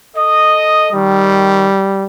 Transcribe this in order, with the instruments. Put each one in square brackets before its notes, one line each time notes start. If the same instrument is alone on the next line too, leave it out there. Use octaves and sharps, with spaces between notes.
[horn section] A4 D#5
[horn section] D#3 [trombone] G3